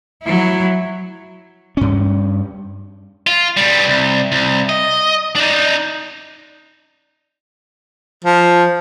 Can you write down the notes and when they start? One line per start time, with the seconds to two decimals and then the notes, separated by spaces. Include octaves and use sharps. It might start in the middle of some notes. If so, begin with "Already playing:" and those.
0.23 F#3 E4
1.77 G2 C#4
3.27 F4
3.57 B2 G3
3.87 C2
4.32 C2
4.69 D#5
5.36 D4 D#4
8.25 F3